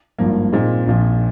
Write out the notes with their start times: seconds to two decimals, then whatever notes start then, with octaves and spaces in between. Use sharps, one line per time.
0.18 G#1 G2 F3 A#3
0.53 A#2 G#3 C4 D#4
0.87 A#1 A#2 F3